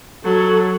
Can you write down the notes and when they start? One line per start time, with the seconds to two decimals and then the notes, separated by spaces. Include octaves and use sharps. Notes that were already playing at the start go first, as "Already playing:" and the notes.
0.24 F#3 A4